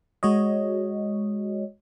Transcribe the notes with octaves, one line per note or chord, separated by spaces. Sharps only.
G#3 F#4 C#5 D#5